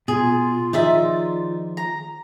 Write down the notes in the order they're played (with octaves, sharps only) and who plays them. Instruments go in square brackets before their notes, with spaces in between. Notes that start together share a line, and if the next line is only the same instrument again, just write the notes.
[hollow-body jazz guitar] B2 [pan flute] F4 [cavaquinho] G#4
[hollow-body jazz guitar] D#3 F3 G#4 [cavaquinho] D#4 D5 E5
[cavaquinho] A#5